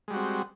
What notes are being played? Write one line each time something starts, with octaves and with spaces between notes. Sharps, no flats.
G3 G#3 C4 F#4